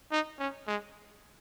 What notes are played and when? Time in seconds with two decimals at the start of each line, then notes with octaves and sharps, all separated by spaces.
0.12 D#4
0.39 C#4
0.67 G#3